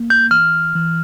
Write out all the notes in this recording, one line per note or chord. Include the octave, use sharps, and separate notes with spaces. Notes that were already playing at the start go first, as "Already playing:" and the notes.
Already playing: A#3
G6
E3 F6
E3